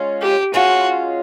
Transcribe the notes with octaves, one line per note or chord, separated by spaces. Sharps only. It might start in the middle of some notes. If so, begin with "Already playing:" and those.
Already playing: G#3 C#4 F4
G4
G#3 C#4 F4 F#4